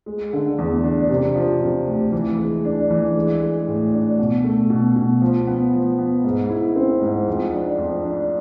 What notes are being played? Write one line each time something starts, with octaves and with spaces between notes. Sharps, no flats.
G#3
D3
E2
D4
C3
F3
C3
D2
E3
G#3
D4
E3
G#3
G#3
A2
D4
B2
A3
B2
B2
F3
B3
F3
B3
G#2
E4
C4
G#2
F2
D4
F2
D4